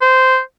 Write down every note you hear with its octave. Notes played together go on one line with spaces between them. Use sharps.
C5